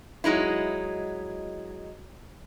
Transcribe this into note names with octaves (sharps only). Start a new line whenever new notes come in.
F#3 G#3 D#4 E4